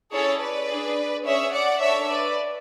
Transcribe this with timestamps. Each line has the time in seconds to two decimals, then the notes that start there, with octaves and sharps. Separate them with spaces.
0.11 C#4 E4 G#4 A4 C#5
0.40 B4 D5
0.69 D4 G#4
1.24 C#4 G#4 C#5 E5
1.52 D5 F#5
1.80 D4 A4 C#5 E5
2.08 B4 D5